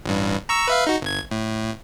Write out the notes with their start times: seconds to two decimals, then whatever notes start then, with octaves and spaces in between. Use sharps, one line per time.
0.06 A1 G2
0.49 A#5 C#6 E6
0.68 B4 E5 F5
0.87 D#4 F#4
1.02 G1 G#6
1.31 A2